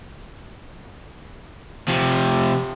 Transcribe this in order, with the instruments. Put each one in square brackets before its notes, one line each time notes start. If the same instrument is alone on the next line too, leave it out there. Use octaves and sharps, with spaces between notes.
[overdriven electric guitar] C3 F3